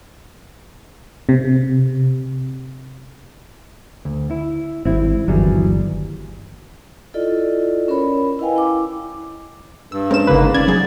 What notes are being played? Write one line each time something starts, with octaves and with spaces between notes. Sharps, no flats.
C3
D2
E4
G#1 G3 C4 E4
G1 D#2 E3 F#3 G3 G#4
E4 F4 A4 D5 D#5
C#4 A#4 C#5 B5
E4 B4 D#5 F5 G5 G#5
E4 D6
G2 E6
G#3 C4 C#4 A#4 E7
G1 G#2 C#3 A#3 B4
C#4 D5 G#6
F#3 D#4 G#4